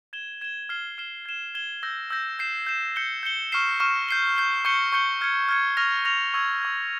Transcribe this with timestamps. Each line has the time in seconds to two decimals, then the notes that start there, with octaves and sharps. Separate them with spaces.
0.13 G#6 E7 G7
0.41 G#6 E7 G7
0.69 F6 C7 E7 G7
0.98 F6 C7 E7 G7
1.26 G#6 E7 G7
1.55 G#6 E7 G7
1.83 E6 G6 A#6
2.10 E6 G6 A#6
2.39 G6 C7 E7
2.67 G6 C7 E7
2.96 G6 C#7 G7
3.23 G6 C#7 G7
3.52 C#6 F6 C7 E7
3.80 C#6 F6 C7 E7
4.09 G6 C7 G7
4.36 G6 C7 G7
4.65 C#6 G6 C#7 G7
4.93 C#6 G6 C#7 G7
5.21 F6 G#6 C#7
5.49 F6 G#6 C#7
5.77 C#6 F6 A#6 F7
6.05 C#6 F6 A#6 F7
6.34 C#6 E6 G#6
6.62 C#6 E6 G#6